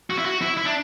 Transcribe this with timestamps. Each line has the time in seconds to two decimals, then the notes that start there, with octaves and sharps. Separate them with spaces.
0.10 F#4
0.18 E4
0.26 F#4
0.41 E4
0.57 E4
0.65 D4